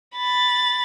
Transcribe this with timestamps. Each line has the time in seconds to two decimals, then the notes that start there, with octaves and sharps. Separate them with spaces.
0.16 B5 A6